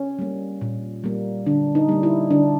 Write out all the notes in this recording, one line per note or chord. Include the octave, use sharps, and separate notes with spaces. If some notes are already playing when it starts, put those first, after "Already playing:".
Already playing: C#4
G3 A#3
A#2
G3 A#3
D3 D4
D#4
G3 A#3
E4
D3 D4